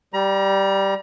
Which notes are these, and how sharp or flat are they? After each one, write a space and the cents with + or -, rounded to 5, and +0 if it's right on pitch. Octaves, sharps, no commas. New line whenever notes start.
G3 +0 A#5 +35